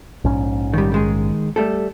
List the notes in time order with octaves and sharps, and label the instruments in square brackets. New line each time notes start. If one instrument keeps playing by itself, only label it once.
[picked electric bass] A#1 G#2 C#4
[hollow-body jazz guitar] D#3 G3
D#3 G#3 G#4
G3 A3 A4